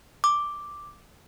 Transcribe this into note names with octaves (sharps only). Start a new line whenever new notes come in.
D6